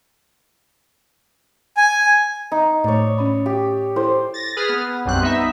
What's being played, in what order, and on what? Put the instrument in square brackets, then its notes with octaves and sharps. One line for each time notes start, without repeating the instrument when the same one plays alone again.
[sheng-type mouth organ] G#5
[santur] D#4 [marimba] D#5
[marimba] A2 A3 [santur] C#5 D5
[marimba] C#4 B5
[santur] G4
[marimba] E4 A4 [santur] C5
[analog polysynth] A6 A#6
G#4 B4 D#6 F6
B3
B1 F#2 F#3 G3 C4 F#6
B3 D#4 E5